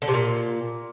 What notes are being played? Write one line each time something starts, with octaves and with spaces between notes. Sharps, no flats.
D3
C3
A#2